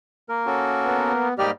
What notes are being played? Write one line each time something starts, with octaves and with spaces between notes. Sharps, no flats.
A#3 A#4
C#4 F#4 A4
B3
G#2 G3 A#3 G4 D5 D#5 F6